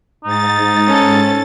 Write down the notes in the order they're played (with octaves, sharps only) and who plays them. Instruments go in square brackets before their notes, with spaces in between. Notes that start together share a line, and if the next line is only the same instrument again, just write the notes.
[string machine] G#2 A6 [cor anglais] D#4
[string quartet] C#4 A4